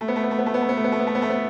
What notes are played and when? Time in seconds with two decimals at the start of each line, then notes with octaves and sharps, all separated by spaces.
0.01 A3
0.08 B3
0.16 A3
0.24 B3
0.31 A3
0.39 B3
0.46 A3
0.54 B3
0.62 A3
0.69 B3
0.77 A3
0.84 B3
0.92 A3
1.00 B3
1.07 A3
1.15 B3
1.22 A3
1.30 B3